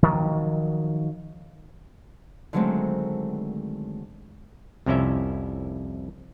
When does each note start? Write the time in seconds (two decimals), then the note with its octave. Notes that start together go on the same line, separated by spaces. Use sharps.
0.03 D#3 F3 F#3
2.53 D3 D#3 F#3 G#3 A3 C4
4.86 C2 F2 C3 C#4 E4 E5